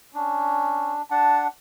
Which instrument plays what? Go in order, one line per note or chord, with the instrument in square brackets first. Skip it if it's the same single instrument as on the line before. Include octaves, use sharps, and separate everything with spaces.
[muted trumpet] C#4 [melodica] D4
[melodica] D4 F#5 [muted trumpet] A5